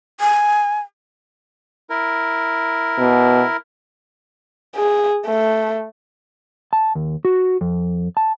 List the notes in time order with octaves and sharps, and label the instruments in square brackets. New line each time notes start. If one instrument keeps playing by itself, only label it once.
[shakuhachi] G#5
[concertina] E4 A#4
[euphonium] B2
[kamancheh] G#4
A3
[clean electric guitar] A5
D#2
F#4
F2
A5